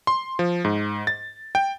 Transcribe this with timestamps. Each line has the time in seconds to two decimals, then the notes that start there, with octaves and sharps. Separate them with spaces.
0.07 C6
0.39 F3
0.65 G#2
1.07 A6
1.55 G5